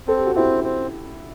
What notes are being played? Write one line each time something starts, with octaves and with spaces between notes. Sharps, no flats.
C4 A4
G4
F#4
C4 E4 G4
C4